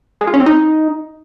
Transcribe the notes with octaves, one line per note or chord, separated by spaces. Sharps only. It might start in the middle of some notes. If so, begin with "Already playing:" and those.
G#3
F4
C#4
C4
D#4